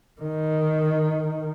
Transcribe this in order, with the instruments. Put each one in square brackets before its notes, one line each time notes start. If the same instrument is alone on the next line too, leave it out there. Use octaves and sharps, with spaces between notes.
[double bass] D#3